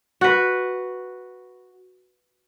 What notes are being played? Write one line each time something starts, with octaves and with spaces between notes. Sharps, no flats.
F#4 B4